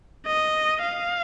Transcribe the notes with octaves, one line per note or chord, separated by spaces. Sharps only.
D#5
F5